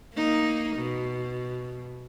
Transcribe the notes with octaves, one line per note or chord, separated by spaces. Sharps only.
A#3 D#4
B2